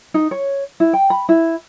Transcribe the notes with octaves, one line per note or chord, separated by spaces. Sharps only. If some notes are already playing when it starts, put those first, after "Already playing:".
D#4
C#5
E4
G5
B5
E4